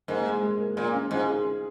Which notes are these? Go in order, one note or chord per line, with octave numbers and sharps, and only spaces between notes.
G#2 A#3
G#3
G#3
A#3
A#2 A#3
G#3 C#4
G#2 C#4 F4
D#4 G#4